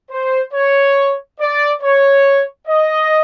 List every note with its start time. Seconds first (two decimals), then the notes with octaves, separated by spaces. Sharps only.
0.11 C5
0.53 C#5
1.40 D5
1.82 C#5
2.68 D#5